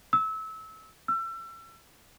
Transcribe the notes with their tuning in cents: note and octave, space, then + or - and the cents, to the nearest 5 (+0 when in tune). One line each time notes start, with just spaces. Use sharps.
E6 -25
E6 +30